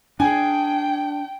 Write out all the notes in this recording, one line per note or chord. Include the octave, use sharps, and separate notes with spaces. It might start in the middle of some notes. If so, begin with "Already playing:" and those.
D4 G#4 G5 G#5